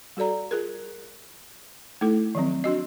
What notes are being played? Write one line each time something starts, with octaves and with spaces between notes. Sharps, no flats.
G3 F#4 A4 D5 A#5
F4 G#4 A#4
A3 D#4 E4 A4
D#3 F3 F#3 C4
D4 F#4 D#5